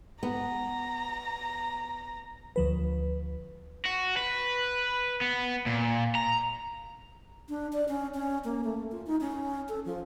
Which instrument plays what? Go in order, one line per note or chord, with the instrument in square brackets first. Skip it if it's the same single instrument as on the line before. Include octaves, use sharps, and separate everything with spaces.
[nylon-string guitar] B3 [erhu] A#5
[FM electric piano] D2 F3 B4
[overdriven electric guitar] F#4
B4
B3
A#2
A#5
[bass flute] D4
D5
C#4
C#4
A#3
A3
F4
D#4
C#4
A4
F3